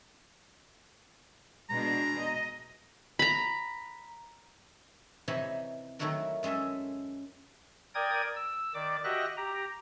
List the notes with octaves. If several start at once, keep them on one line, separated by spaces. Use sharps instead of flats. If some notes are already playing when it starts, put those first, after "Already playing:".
B2 G#3 D4 A#5
D#5
A#5 B5
C3 E3 D#4 C#5 D#5 B5
D#3 F#3 A3 E4 F#4 A#4
F#2 G#3 C#4 A4 E5
A#4 D5 G5 D#6 G#6
E6
D#3 D5 D6
F#4 G4 D#5 E5 F#6 A#6
G4 A#5